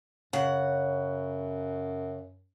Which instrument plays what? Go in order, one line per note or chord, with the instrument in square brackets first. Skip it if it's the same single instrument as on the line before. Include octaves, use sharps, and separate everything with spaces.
[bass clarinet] F#2 [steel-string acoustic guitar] C#3 F#5